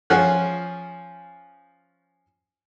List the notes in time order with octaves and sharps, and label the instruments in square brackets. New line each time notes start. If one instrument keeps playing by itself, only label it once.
[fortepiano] F3 C#4 G#4 F#5